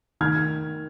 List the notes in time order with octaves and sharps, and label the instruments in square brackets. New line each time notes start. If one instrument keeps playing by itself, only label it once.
[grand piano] D#3 F6 G#6